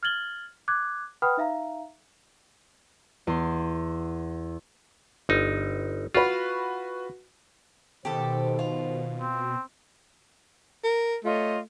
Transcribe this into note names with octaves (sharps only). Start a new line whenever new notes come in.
F6 G#6 A6 F#7 G7
D6 F#6 G#6
B4 F#5 G5 B5 D#6 F6
D#4 E5 F5 A#5
E2 C6
G1 D#4
F4 F#4 B4
B2 D#3 G4 A4 C5
F4
C4
A#4
A3 F4 C#5 D#5